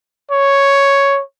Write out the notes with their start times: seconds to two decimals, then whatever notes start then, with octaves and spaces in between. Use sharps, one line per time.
0.31 C#5